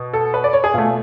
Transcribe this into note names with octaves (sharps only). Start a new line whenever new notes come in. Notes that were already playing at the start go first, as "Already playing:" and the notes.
Already playing: B2
A4
B4
D5
C#5
G#4
B2 A3 F4